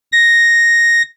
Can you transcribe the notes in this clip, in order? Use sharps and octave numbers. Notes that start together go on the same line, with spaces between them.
A#6